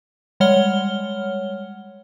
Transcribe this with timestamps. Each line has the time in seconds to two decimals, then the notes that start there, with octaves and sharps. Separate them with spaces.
0.40 G3 G#3 C#5 F#5 F6 G7